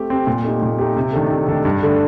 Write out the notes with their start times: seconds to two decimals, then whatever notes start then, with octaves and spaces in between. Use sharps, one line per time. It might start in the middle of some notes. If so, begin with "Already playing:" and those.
Already playing: A3 C4 G4
0.10 C4 G4
0.27 A#2
0.44 A3 D#4 G4
0.62 A#2
0.79 A3 D#4 G4
0.97 C3
1.13 D#3 A3 D4 A4
1.31 C3
1.48 D#3 A3 D4 A4
1.65 G2
1.83 D3 A3 D4